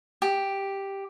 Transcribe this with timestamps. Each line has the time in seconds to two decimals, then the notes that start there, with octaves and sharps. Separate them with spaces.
0.22 G4